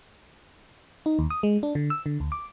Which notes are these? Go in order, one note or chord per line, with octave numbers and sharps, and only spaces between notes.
D#4
D#2
D#6
G#3
D4
D3
E6
D3
D2
D6